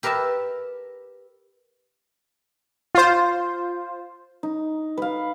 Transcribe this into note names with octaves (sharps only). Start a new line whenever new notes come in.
G4 A#4 B4 E5 A5
F4 C5
D#4
B4 F5